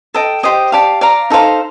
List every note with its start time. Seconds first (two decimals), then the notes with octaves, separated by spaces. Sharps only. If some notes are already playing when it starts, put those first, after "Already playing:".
0.14 A4 D#5 G5
0.43 G4 C5 D#5 G5
0.72 G4 D5 F5 A5
1.01 D5 F5 A#5
1.30 D#4 A4 C5 F5